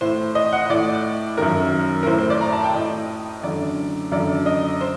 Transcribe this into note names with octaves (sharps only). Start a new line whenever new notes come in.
A2 C5
D#5
F#5
A2 D5
F#2 D#3 A#4
A#4
A2 C5
C5
D5
A#5
A5
G5
A2 D#5
F#2 D3 D5
F#2 D3 D5
D#5
C5